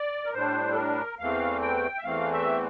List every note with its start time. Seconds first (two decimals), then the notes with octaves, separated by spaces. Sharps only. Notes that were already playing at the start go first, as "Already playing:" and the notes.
Already playing: D5
0.25 A#4
0.34 A2 G3 D4 C5
0.72 A4
0.77 A#4
1.19 E2 E3 A3 C4 F5
1.62 G5
1.98 E5
2.04 E2 E3 A3 C4 F5
2.32 E5